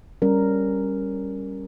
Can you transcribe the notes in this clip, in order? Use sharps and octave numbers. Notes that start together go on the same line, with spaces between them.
G3 C#4 A#4